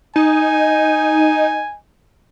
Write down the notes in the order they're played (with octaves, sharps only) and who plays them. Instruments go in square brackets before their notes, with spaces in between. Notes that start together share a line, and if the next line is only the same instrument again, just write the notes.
[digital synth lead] D#4 [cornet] G#5